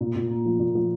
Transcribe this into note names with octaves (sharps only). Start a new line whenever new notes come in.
A#2
A#2
A#3
F3
A#2
F3